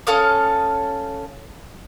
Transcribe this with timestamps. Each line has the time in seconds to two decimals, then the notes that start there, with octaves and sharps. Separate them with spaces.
0.07 C#4 A4 F5 D#6